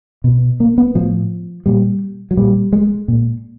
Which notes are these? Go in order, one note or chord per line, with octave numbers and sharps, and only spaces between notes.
B2
A#3
B3
A2 F3
A#2 G3
F#3
A#2 G3
G#3
A#2